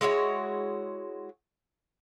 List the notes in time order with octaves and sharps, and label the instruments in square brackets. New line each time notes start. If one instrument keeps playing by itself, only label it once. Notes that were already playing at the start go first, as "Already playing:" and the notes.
[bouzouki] G#3 E4 F#4 C#5